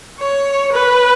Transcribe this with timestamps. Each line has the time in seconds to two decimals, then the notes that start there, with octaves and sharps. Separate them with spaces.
0.19 C#5
0.72 B4